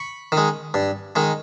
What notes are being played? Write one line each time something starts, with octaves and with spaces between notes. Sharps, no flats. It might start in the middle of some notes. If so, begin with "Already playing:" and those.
Already playing: B5 C#6
D#3
G#3
G2
D#3 G#3